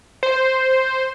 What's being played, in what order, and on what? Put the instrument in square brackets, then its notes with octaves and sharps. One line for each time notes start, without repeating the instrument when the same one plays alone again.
[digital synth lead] C5